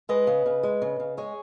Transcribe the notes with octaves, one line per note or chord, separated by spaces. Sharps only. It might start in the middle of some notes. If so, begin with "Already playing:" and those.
G#3 B4 D#5
C#3
C#3
G#3
C#3
C#3
G#3 G#4 C#5